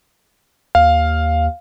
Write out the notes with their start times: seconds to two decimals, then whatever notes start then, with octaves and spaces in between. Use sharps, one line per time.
0.75 D#2 F5